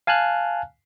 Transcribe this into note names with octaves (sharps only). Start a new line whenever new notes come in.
F5 G#5 A5 F6 F#6